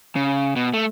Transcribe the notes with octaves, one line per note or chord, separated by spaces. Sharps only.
C#3
B2
A3